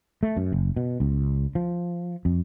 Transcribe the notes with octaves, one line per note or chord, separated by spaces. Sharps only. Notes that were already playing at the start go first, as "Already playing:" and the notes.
A3
F#2
F#1
B2
C#2
F3
F2